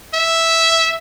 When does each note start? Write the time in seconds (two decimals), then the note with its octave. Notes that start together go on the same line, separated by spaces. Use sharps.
0.14 E5